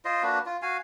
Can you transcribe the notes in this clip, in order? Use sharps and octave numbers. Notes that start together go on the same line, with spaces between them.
F4 C5 D#5
A#3 D4 F#4 B4
F4
F#4 F5 G#5